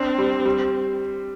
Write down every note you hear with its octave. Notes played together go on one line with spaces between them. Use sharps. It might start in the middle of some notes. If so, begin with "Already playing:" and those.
Already playing: C4 D4
G3
G3